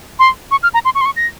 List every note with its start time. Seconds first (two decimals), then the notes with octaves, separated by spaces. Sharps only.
0.19 C6
0.51 C#6
0.63 F6
0.74 A#5
0.85 C6
0.95 C#6
1.01 C6
1.05 C#6
1.16 A#6